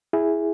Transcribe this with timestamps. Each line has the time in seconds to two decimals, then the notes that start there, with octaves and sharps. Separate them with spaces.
0.13 E4 G#4